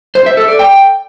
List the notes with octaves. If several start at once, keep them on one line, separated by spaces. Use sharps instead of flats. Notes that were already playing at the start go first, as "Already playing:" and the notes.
C5
E5
A4
D5
G5